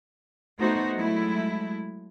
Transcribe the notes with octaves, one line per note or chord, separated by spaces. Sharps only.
A3 B3 D#4 F#4 C5
F#3 G#3 A3 E4